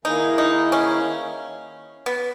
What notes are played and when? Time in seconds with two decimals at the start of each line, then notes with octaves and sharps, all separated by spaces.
0.05 D#3 A#3 D#4 E4 G#4
0.38 D#4
0.72 C#4
2.06 B3